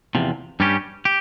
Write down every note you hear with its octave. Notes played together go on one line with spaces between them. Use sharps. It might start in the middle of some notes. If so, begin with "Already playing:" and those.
E2 C3 F3
G2 G3 C#4 G4
G4